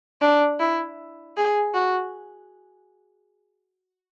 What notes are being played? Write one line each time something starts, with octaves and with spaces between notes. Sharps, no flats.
D4
E4
G#4
F#4